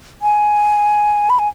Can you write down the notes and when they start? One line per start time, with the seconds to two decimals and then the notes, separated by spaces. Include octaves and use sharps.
0.22 G#5
1.30 B5
1.39 G#5